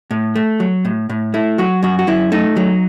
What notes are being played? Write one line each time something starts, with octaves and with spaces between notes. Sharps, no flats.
A2
A3
F#3
A2
A2
A3 E4
F#3 F#4
F#2 F#4
F#4
F#2 E4
A3 D#4
F#3